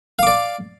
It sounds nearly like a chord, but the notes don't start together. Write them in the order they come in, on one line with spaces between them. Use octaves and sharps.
F5 D6 D5